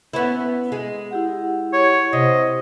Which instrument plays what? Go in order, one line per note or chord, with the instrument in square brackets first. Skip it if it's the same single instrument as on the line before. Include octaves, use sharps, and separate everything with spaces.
[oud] B3 C#4 E4
G#3
[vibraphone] E4 G4 F#5
[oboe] C#5
[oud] C3 [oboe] D#5